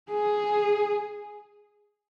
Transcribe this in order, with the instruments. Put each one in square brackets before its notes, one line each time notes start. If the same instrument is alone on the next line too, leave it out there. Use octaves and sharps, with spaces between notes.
[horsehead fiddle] G#4